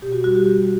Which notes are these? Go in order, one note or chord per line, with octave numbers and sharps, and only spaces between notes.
B2 G4
F#4
G3 F#4
G4
G3 G4